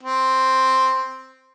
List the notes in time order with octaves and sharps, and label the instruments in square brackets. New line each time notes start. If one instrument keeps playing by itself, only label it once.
[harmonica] C4